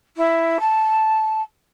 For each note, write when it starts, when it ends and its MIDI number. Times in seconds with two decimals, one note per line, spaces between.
0.16 0.58 64
0.60 1.41 81